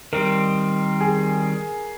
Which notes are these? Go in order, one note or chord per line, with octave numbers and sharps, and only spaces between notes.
D#3 G3 C4 A#4
G#4